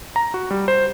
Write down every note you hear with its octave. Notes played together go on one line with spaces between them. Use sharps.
A#5
F#4
G3
C5